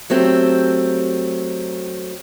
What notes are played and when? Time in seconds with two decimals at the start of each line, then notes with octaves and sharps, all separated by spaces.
0.10 F#3 A3 C4 G4